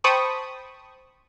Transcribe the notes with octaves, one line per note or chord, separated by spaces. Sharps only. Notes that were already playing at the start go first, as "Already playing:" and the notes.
C5 G5 A5 B5 C#6 D#6